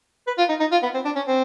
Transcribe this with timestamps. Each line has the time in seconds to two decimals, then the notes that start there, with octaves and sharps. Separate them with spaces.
0.27 B4
0.38 F4
0.49 D#4
0.60 D#4
0.72 F4
0.83 B3
0.94 C4
1.05 D4
1.15 C#4
1.27 C4